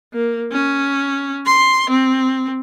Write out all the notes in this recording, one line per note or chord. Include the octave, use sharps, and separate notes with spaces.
A#3
C#4
C6
C4